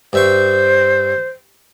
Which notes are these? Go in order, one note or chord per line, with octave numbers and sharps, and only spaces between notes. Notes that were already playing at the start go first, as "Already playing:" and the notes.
G2 C5 E5 C#6